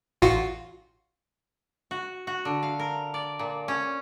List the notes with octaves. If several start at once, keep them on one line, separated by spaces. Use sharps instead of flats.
A1 F4 F#4
F#4
F#4
D3
F5
A#4
D5
A#2
C#4